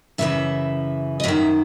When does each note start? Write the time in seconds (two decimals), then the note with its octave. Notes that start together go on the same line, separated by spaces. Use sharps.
0.18 F#2 C#3 E3 E5
1.20 D#5
1.24 F#2 D#3 E5